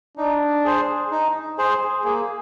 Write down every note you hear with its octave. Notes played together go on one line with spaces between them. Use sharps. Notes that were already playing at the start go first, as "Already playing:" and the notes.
D4 D#4
G#4 C5
D#4
G#4 C5
A#3 G#4